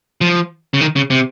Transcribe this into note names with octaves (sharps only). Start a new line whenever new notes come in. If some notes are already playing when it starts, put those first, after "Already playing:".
F3
C#3
D#3
C#3
C3